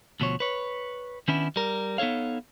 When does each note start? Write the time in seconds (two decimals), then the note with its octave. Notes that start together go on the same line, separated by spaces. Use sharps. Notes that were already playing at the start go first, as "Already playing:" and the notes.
0.20 D2 B2 F3 C#5
0.40 B4 C#5
1.28 D#3 B3 C#4 D4 E4
1.56 G3 A#4
1.98 B3 D#4 A4 C#5 F5